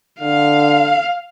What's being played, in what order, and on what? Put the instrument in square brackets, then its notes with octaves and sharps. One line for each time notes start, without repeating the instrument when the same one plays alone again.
[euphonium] D3 [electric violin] F5